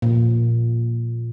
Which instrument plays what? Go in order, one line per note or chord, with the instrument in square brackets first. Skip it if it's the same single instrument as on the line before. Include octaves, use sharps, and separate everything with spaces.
[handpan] A#2